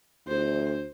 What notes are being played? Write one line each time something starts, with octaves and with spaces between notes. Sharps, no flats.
D2 C5